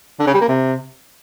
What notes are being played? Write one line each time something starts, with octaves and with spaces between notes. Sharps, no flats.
D3
C#3
G3
A#3
C3